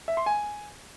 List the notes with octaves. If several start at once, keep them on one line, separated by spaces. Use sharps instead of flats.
E5
C6
G#5